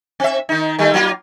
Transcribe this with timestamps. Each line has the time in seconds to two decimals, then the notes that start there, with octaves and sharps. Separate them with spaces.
0.20 C4 E5
0.49 D#3 D#4
0.79 D#3 G3 A3
0.94 F#3 A#3 F4